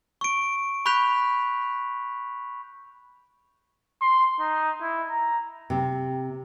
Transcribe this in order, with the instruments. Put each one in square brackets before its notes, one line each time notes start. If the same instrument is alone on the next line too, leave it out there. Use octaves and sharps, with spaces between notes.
[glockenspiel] C#6 D7
B5 C#6 F#6 G6 B6 F7
[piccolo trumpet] C6
D#4
E4
A#5
[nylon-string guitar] C3